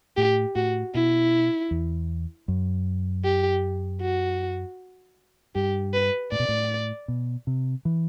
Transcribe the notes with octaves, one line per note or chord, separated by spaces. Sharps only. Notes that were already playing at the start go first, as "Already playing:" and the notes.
A2 G4
A2 F#4
B2 E4
E2
F#2
G4
F#4
G2 G4
B4
A2 D5
B2
A2
B2
C3
E3